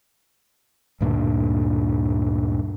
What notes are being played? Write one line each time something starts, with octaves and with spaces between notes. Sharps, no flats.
D2 G2 A#2 D3